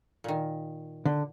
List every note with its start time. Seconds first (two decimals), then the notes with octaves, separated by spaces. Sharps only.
0.24 A#2 D#3
1.06 D3